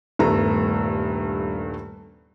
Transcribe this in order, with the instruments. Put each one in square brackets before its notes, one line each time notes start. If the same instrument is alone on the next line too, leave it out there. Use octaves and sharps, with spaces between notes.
[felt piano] D#1 G2 A3 B3 A#5